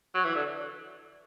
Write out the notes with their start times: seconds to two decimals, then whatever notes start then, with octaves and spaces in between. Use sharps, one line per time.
0.14 F#3
0.24 E3
0.35 D3